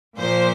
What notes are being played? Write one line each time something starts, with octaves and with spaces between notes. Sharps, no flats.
A#2 F3 C5